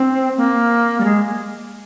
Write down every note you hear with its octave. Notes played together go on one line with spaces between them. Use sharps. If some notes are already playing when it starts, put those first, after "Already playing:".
Already playing: C4
A#3
G3
G#3